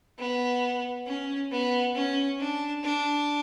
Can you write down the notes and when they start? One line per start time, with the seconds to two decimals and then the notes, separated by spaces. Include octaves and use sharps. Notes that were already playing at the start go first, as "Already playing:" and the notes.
0.19 B3
1.07 C#4
1.52 B3
1.95 C#4
2.40 D4
2.83 D4